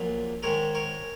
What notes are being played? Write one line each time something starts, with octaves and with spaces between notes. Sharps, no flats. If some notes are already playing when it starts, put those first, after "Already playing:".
Already playing: A#1 A#2 F#3
G#2 D#3 G#3 A#4 C#5
A#4 C#5